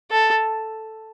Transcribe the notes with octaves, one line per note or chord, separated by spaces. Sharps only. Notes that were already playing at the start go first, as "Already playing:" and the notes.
A4